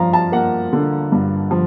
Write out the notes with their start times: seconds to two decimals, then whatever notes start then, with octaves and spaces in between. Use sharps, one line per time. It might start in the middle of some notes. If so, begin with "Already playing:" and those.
Already playing: G2 F3 F5 A#5
0.13 A5
0.32 A#3 F#5
0.73 D3
1.12 G2
1.51 F3